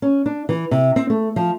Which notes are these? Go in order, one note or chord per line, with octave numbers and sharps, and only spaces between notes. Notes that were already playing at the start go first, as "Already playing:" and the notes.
C#4
D4
E3
C3
C4
A3
F3